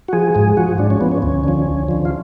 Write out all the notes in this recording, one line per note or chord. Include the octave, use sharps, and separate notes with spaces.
F#4
F3 G#4
G#2 G#4
F3 F#4
G#2 D4
C#4
F3 B3
C#4
D2 C#4
D3 F3
D2
D3 F3
F4